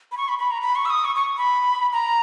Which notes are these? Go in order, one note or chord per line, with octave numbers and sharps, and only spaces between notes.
B5
C#6
B5
B5
A#5
B5
C#6
E6
D#6
C#6
C#6
B5
A#5